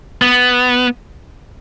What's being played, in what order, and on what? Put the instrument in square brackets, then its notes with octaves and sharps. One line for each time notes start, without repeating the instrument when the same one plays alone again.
[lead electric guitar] B3